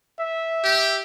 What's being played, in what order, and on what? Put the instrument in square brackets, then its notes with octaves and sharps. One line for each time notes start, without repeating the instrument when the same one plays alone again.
[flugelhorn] E5
[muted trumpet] G4